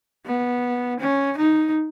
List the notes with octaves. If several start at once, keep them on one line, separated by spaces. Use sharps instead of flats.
B3
C#4
D#4